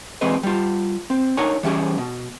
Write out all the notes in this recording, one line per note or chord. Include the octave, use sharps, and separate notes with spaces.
E3 G#3 C4 G#4 B4 D#5
G3 F4
C4
D4 D#4 A#4 C#5 F#5 G#5
E3 G3 C#4 G4 G#4
B2